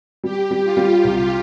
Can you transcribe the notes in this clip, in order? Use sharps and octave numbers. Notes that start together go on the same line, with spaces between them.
G3 G4
G3
F4
G3
C2 F4